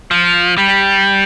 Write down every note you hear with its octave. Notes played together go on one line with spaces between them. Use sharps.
F3
G3